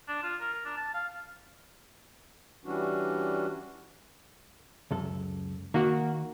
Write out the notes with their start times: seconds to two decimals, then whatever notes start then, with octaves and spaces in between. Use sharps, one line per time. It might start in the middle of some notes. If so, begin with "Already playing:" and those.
0.08 D4
0.23 F4
0.40 A#4
0.53 A#4
0.65 D4
0.77 A5
0.94 F5
2.65 E3 G3 C#4 D4 F#4
4.91 C#2 F#2 A4
5.74 D#3 A#3 F#4